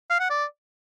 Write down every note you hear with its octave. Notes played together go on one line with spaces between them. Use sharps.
F5
F#5
D5